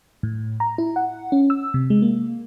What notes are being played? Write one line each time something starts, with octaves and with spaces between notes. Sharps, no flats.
A2
A#5
E4
F#5
C#4
E6
C3
G#3
A#3